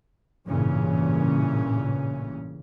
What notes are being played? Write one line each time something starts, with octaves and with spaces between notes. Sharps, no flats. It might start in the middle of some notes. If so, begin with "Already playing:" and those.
A1 G2 A#2 C#3 E3 C#4